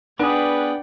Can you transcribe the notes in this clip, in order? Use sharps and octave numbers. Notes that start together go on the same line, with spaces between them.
B3 D4 G#4 B4 D5 F#5 G5